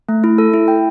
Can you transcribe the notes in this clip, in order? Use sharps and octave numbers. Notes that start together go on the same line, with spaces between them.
A3
E4
A4
E4
G5